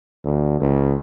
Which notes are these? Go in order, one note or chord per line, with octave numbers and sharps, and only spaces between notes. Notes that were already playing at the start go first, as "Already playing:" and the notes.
D2
C#2